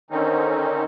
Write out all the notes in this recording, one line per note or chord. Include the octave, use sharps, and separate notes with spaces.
D3 D#3 C4 C#4 D#4